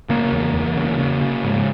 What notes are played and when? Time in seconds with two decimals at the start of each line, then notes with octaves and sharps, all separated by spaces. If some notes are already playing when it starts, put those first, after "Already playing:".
0.09 C#3 A#3
0.33 E2
0.54 E2
0.76 C#3
0.99 C#3
1.21 C#3
1.44 G#2